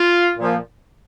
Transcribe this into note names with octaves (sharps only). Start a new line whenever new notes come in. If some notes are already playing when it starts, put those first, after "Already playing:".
Already playing: F4
A#2 F3